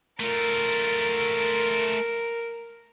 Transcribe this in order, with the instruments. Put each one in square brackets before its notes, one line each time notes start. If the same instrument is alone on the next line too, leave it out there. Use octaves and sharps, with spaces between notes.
[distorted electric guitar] A3 F4 [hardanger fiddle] A#4